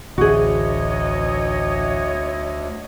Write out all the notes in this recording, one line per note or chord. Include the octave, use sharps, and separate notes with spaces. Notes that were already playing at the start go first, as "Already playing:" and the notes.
A1 D2 D3 F#4 G#4 C#5 D#5